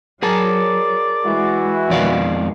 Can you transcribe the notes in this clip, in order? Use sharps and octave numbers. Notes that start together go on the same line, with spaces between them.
F#3 G#4 A#4 D5 A5
E3 G#3 E4 F#4
F2 B2 D#3 G#3 D5 F5